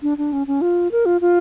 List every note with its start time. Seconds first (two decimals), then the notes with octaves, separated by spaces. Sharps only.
0.02 D4
0.18 D4
0.33 C#4
0.47 C#4
0.61 F4
0.92 A#4
1.06 F4
1.21 F4